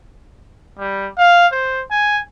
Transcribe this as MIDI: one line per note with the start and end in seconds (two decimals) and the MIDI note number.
0.79 1.08 55
1.18 1.47 77
1.52 1.82 72
1.91 2.20 80